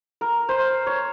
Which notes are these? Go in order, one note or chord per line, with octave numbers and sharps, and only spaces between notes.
A#4
C5
C#5